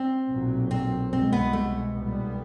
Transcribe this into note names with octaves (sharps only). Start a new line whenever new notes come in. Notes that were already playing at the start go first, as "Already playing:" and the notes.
Already playing: C4
B1 A#2 F#3
C4
C2 B2 G#3 C4
B3
A3
B1 A#2 G3 B3